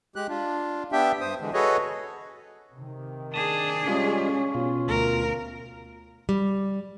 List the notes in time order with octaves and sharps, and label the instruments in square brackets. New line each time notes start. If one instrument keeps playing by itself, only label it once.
[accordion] G#3 G4 F#6
D4 F4
B3 D4 G4 E5 G5
G2 C5 D#6
D3 E3 G#3
F#4 G#4 A4 B4 C#5 D#5
[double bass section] C3 D#3
[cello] D4 G#4 [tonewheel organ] A5 D#6
[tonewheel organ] G3 G#3 F4 [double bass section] C#4
[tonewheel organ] B2 F4
[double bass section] D2 [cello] A#4
[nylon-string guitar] G3